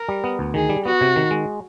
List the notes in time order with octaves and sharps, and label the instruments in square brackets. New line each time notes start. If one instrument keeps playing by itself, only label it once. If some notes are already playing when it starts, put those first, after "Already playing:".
Already playing: [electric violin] A#4
[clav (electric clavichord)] G3
B3
D2
[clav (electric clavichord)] D#3 [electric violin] G#4
[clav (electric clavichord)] G3
[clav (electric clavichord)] B3 [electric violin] F#4
[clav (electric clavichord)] C3
D#3
G#3